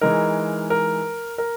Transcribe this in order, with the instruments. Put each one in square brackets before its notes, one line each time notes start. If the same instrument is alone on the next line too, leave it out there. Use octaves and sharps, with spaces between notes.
[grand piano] E3 G#3 D#4 A#4
A#4
A#4